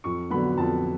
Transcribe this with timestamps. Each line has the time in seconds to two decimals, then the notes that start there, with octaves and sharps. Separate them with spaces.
0.04 F2 C#6
0.30 D3 F#3 B3 B5
0.58 F2 A5